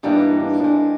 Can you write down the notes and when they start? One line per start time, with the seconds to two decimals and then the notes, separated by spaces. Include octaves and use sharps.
0.03 G2 E3 G3 A#3 D4 D#4
0.40 D4
0.60 C3 D#3 G#3 D4